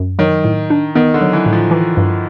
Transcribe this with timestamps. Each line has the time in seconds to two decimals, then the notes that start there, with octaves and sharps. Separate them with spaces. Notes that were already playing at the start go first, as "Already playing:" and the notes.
Already playing: F#2
0.19 D#3 F#3
0.44 A2
0.70 D4
0.95 D#3 B3
1.14 D3
1.21 F#3
1.33 E3
1.46 A2
1.53 F3
1.71 E3
1.97 G2